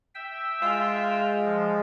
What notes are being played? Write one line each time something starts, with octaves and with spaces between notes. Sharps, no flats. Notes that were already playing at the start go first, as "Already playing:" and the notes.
E5 G5 E6
G#3 F4
F3